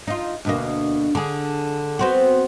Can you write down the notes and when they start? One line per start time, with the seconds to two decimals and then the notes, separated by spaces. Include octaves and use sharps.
0.07 D#4 F4
0.45 D2 B2 A#3
1.15 D3 G#4
1.99 B3 C4 F#4